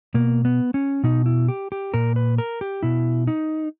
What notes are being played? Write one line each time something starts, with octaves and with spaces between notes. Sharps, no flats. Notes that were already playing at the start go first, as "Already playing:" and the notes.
B2 A#3
B3
C#4
B2 D#4
E4
G4
G4
A#2 A#4
B4
A#4
G4
B2 E4
D#4